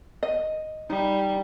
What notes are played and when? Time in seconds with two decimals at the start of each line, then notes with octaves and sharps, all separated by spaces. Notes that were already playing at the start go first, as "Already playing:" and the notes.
0.23 D#5
0.90 G3 D#4